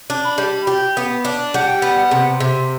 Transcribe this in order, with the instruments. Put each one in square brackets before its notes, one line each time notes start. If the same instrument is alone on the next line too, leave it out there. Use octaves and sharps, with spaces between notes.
[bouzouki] D4
[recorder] B5
[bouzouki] G3
G4
B3
D4
[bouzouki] G3 [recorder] F#5
[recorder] G5
[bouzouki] B3 [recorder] F#5
[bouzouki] C3
C3